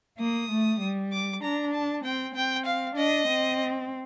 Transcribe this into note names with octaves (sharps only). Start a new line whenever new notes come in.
A#3 D#6
A3
G3
D6
D4 A#5
A5
C4 G5
C4 G5
F5
D4 D#5
C4